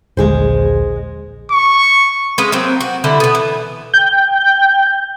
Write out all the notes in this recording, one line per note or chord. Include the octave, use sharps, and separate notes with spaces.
D#1 A#1 D3 G#3 G#4 C5
C#6
G#3 C#4 B4 F5
F#3 A#3 C4
F#4
D3 G3 E4
B2 B3
E3
G5 G6